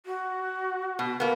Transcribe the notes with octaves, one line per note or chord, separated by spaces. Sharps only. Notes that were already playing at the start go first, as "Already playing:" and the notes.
F#4
B2
A#3 B3